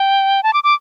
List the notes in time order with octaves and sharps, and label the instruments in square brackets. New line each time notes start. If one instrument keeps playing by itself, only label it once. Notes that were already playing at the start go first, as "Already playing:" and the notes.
Already playing: [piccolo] G5
A5
D6
D6